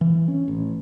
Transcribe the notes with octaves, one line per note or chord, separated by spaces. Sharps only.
E3
C#4
A1